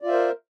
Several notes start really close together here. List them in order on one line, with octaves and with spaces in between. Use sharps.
D5 F4 E5 C5 A#4